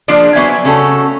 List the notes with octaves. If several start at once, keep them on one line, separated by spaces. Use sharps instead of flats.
F3 A#3 D4 F4 G#4 D5
F#3 B3 C5 E5 G#5
C#3 A3 C#4 F#4 A4